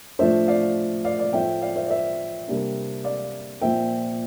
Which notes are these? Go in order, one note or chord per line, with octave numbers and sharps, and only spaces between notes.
A2 F3 A3 D4 C5 E5
D5 F5
D5 F5
D5 F5
A2 F3 A3 C4 E5 G5
D5 F5
C5 E5
D5
C5 E5
C3 G3 A#3 D4
D5 F5
A#2 F3 C4 E5 G5